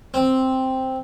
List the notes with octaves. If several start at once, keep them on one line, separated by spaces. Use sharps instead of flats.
C4